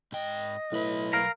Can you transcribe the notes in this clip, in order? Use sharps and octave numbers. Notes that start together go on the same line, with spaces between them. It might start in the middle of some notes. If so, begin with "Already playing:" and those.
G#2 D#5 G5
B1 A2 B4
A#4 F5 A#5